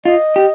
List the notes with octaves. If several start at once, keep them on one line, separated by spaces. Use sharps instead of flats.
F4 D#5
G4